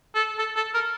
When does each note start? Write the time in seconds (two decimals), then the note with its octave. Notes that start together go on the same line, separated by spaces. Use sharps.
0.15 A4
0.39 A4
0.56 A4
0.74 A#4